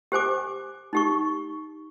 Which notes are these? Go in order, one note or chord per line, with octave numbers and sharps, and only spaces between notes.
G4 C5 G#5 D6
D#4 G4 C#6